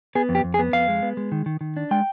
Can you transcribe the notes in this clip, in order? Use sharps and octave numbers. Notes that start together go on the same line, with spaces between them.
B3 G#4
F2
G4
F2
G#4
B3
F2 F5
G#3
B3
G#3
D#3
D#3
D#3
D4
G#3 G5